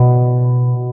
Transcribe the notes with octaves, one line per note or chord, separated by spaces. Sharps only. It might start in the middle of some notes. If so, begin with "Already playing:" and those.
Already playing: B2